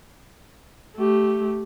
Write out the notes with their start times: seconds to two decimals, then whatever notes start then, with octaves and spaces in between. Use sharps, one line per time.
0.97 A3 G4